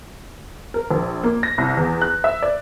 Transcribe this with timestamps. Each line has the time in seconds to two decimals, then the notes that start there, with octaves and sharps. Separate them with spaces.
0.74 A#4
0.91 A#1
1.24 A#3
1.43 A#6
1.58 C2
1.77 E2
2.02 F#6
2.24 E5
2.42 D5